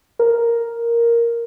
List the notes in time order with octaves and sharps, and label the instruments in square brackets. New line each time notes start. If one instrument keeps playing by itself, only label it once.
[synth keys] A#4